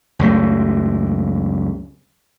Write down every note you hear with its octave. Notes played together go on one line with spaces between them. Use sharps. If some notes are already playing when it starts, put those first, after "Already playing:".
C#2 F#2 F#3 A3